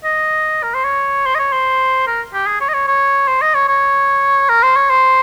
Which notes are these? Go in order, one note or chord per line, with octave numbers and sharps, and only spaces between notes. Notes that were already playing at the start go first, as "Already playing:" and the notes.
D#5
A#4
C5
C#5
C5
D#5
C#5
C5
A#4
G4
G#4
C#5
D#5
C#5
C#5
C5
D#5
C#5
C#5
A#4
C5
C#5
C5